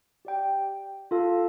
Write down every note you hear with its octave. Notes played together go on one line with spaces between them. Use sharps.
G4 D5 G5
F4 A4 F5 A5